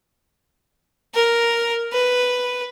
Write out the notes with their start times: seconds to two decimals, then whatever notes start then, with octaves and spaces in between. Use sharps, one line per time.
1.14 A#4
1.92 B4